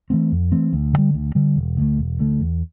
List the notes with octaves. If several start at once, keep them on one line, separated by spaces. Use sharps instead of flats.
E3 A3 C4
F2
E3 A3 C4
D2
D3 G3
D2
D3 G3
E1
D2 D3 A3
E1
D2 D3 A3
E2